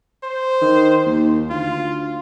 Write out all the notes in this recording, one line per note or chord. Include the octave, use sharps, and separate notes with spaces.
C5
D#3
D#2
D2 F4